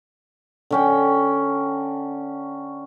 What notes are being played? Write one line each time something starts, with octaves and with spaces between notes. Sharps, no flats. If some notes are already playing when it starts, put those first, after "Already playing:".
D3 C#4 G5